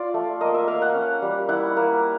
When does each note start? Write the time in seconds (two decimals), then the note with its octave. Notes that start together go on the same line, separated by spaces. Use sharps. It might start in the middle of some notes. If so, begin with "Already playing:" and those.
Already playing: F4 D5
0.14 A3
0.41 A#3 D#5
0.55 E5
0.68 A#3 F5
0.82 F#5
0.94 C#4
1.22 G3
1.49 E4 F#5
1.77 A#3